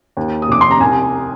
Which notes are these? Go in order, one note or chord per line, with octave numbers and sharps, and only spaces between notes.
D#2
D#6
F1 D6
C6
A#5
C2 G#5